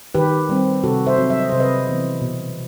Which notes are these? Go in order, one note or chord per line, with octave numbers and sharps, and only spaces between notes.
D#3 G4 B4
G3 C4
C3 F#4 A4
C5 E5
F#3 C4
E5
D#5
C3 C5
B4 D#5
E3 B3
B2